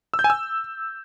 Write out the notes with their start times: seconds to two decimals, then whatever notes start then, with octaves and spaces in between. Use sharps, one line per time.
0.14 E6
0.19 G6
0.24 G#5
0.30 E6